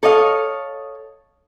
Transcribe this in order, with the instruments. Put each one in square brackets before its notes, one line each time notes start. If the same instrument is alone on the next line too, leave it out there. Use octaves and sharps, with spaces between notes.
[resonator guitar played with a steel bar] A4 C#5 D#5 F5